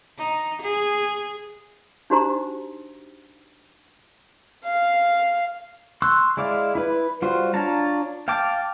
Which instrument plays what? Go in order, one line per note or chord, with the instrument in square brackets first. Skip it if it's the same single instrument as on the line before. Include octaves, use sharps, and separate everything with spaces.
[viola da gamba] D#4
G#4
[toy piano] D4 D#4 F#4 G4 C5 A#5
[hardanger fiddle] F5
[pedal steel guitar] C6 C#6 E6 F#6
G#3 E4 D5 F5
E4 B4
G3 F4 F#4 C5
D4 F4 C#5 A5 A#5
F5 G5 A5 D6